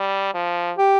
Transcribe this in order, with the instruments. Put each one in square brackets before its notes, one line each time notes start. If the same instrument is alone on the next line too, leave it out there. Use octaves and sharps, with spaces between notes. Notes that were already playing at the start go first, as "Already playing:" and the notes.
Already playing: [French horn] G3
F3
[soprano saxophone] G4